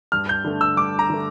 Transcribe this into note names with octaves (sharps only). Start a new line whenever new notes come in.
G2 F6
G6
D3 A3
E6
G2 D6
A#5
D3 A3